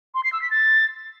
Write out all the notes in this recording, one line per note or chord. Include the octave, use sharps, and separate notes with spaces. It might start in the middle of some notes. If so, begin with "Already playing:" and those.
C6
C7
E6
B6
A6